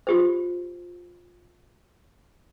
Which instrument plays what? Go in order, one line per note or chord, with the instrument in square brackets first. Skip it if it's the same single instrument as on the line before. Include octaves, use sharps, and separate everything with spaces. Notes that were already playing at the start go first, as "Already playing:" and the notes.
[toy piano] F4 G4 C5